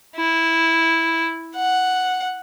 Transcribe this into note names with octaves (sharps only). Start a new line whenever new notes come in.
E4
F#5